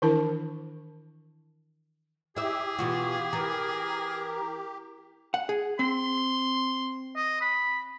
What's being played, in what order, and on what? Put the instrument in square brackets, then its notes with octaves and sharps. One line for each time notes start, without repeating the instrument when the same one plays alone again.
[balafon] D#3 E3 D4 E4 A#4 A5
[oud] E4 E5 [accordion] G4 [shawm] G#4
[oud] B2 E3 F#4 [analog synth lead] F4
[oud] E3 [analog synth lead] A#4
[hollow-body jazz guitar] F#5
G#4
[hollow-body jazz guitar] C4 [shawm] C6
[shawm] D#5
B5